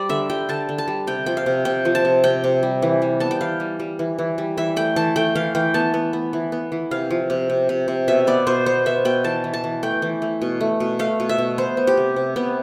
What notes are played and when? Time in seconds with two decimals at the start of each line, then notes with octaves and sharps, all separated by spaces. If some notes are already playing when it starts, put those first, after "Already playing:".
Already playing: G3 D5
0.09 D3 E5
0.30 G3 G5
0.49 D3 A5
0.69 D3
0.78 A5
0.88 G3
1.07 C3 G5
1.26 F3 G5
1.37 F5
1.46 C3
1.65 C3 G5
1.85 F3
1.95 A5
2.05 C3
2.24 C3 G5
2.44 C3
2.63 G3
2.82 E3
3.02 G3
3.20 B3 A5
3.31 G5
3.41 E3 F5
3.60 G3
3.80 G3
3.99 E3
4.18 E3
4.38 G3
4.57 E3 E5
4.76 A3 G5
4.96 E3 A5
5.16 A3 G5
5.35 E3 F5
5.55 E3 G5
5.74 B3 A5
5.94 B3
6.13 B3
6.33 E3
6.52 B3
6.72 E3
6.91 C3 F5
7.10 F3
7.30 C3
7.50 C3
7.69 C3
7.88 C3
8.08 B2 E5
8.27 B3 D5
8.47 B2 C5
8.66 B3 C5
8.86 B3 E5
9.05 B2 G5
9.24 E3 A5
9.44 E3
9.54 A5
9.64 E3
9.83 A3 G5
10.02 E3
10.22 A3
10.42 B2
10.61 A3
10.80 B2
10.99 A3 F5
11.20 B2
11.29 E5
11.38 B2
11.58 B3 C5
11.77 B3
11.87 G4
11.97 C3
12.16 C3
12.36 C3 B3